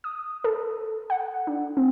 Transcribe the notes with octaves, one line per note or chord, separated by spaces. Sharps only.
D#6
A4
F#5
D4
C4